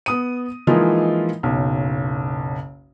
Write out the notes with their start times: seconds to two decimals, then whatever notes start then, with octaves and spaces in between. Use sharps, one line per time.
0.06 B3 D#6 D#7
0.67 E3 F3 G#3 A#3 D#4 F4
1.43 F#1 B1